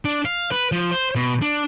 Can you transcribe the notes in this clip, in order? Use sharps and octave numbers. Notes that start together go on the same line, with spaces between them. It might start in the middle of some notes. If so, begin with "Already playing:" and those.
D4
F5
B4
F3
C5
B2
D4